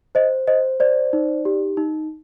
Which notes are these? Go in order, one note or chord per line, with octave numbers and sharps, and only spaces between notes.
C5 D#5
C5 D#5
C5 D5
D#4
G4
D#4